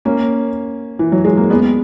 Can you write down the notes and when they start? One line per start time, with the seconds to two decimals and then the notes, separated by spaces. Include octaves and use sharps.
0.05 A#3 C#4
0.99 E3
1.12 F#3
1.24 G#3
1.37 A#3
1.50 G#3 B3